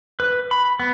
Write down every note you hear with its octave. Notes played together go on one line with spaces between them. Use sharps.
B4
B5
B3